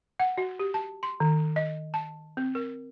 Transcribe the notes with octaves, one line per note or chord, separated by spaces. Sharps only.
F#5
F#4
G4
A5
C6
D#3
D#5
A5
C4
A#4